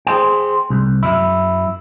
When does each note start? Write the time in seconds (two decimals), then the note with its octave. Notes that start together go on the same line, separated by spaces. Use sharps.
0.07 G#4 C5 G5
0.70 C2
1.03 F#2 E4